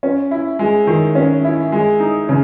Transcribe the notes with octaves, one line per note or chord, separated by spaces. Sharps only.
C#4
E4
G#3
D#3
C#4
E4
G#3
D#4
C#3